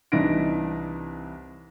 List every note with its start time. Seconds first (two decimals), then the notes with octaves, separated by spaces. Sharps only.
0.12 C2 E3 D4 D#4 A#6 D7